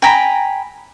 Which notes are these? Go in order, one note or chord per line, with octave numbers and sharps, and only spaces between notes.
G5 G#5 A#5 B5